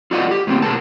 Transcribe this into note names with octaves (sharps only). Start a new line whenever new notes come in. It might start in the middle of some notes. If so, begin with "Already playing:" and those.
F4 F#4 A4 D5 D#5 F#5
G4
A2 D3 A#3 C4 G4
B2 G#4 A#4 A5